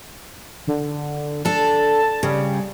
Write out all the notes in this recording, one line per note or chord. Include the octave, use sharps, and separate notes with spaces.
D3
D4 A4 A5
C#3 G3